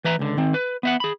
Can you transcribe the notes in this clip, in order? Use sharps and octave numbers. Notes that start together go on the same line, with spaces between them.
E3 B4 E5 A#5
C#2 D3
D#3 C4
B4
B3 E5 F#5
G#4 B5